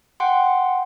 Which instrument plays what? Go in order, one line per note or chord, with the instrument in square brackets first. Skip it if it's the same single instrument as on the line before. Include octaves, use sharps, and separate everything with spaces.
[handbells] F#5 G5 C6